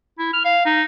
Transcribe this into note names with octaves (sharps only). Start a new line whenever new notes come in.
E4
F6
F5
D#4